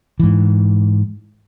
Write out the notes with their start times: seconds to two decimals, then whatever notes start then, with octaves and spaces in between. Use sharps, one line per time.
0.20 G#2 E3